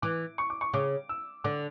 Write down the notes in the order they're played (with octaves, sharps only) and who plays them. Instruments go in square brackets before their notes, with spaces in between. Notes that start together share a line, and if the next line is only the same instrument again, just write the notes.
[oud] E3 [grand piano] D6
[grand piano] C#6
D6
C#6
[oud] C#3 [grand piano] D6
[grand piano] E6
[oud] D3 [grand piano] D6